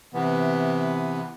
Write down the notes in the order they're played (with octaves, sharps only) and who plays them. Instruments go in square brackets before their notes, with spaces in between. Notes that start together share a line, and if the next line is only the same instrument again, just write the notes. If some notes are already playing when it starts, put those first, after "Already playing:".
[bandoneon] C3 E3 B3